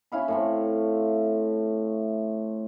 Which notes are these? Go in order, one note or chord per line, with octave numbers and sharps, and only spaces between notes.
C#4 E4 F5 B5
A2 A3 C4